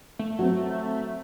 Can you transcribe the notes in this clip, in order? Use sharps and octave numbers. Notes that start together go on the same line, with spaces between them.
A3
F#3 C4 F#4